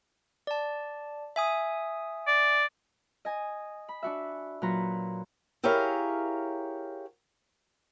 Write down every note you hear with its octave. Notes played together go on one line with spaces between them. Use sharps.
D5 A5
E5 G#5 D#6
D5
D#5 G#5
B5
D4 F#4 E5
A#2 F#3 F#4 B4 A#5
E4 G4 G#4 A#4 C#5 F5